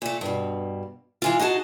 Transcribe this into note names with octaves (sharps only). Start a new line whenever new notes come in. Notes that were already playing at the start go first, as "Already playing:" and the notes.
A#2 A3
G2 B2
E3 G#3 F4
D#4 F#4 G#4 G#5 A5